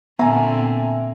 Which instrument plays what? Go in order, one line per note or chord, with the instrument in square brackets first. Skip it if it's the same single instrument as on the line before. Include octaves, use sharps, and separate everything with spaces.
[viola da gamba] A#2 D3 C4 [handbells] B3 [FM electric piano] E5 [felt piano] G#5 A#5